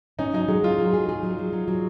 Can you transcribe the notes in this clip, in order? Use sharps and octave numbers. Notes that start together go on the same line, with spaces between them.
C#4 D#4
F#3 D#4
F#3 G#3
F#3 F4
F#3
G#4
G#4
F#3
F#3
F#3
F#3